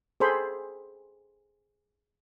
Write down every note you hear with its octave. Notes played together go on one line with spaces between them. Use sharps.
G#4 A4 C5 B5